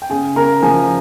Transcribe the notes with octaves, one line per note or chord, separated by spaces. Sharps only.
G5
C#3 G#4 G#5
C#3 A#4 A#5
F3 G#4 G#5